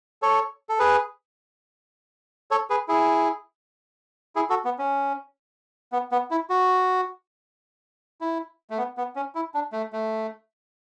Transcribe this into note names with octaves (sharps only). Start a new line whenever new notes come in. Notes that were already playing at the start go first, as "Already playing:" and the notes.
A4 C#5
A4
G#4 B4
A4 C#5
G#4 B4
E4 G#4
E4 G#4
F#4 A4
B3
C#4
B3
B3
E4
F#4
E4
A3
B3
B3
C#4
E4
D4
A3
A3